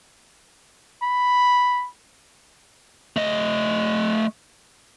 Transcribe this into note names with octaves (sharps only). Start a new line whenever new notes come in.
B5
A3 D#5